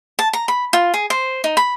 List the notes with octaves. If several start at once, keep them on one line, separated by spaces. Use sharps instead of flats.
A5
A#5
B5
F4
G#4
C5
D#4
B5